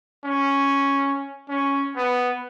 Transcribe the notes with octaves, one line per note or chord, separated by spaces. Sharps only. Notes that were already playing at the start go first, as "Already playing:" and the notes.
C#4
C#4
B3